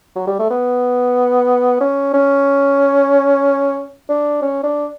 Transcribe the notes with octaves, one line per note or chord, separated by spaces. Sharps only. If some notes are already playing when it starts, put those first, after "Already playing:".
F#3
G3
A3
B3
C#4
C#4
D4
C#4
D4